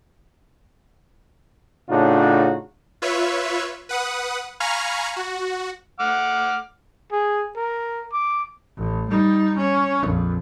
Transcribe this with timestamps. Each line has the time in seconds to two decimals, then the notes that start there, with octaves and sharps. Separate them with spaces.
1.89 A2 C#3 D4 D#4 F4 F#4
3.02 F4 B4 C#5 E5
3.89 B4 F#5 D#6
4.60 F5 G#5 A#5 B5 C#6 F6
5.16 F#4
6.00 F#5 D6 F6
7.12 G#4
7.57 A#4
8.12 D6
8.78 A1
9.09 G3 D#4
9.58 C#4
10.03 A#1 F2